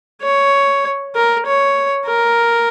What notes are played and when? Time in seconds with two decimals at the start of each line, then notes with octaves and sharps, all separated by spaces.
0.22 C#5
1.15 A#4
1.46 C#5
2.07 A#4